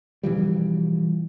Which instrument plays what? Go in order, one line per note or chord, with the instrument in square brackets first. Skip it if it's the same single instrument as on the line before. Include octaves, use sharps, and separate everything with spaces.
[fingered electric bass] B2 E3 F3 G3